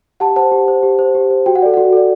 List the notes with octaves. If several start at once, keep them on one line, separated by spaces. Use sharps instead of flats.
G4 F#5 A5
C5 F#5 A5
G4
C5
G4
C5
G4
C5
F#4 G5
F#5
A4 D5
F#4 F#5
A4 D5